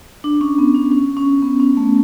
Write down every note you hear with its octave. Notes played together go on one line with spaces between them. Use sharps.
D4
C#4
B3
C#4
C#4
C#4
B3
C#4
A3